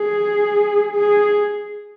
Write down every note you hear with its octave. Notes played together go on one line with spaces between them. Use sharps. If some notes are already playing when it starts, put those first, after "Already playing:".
Already playing: G#4
G#4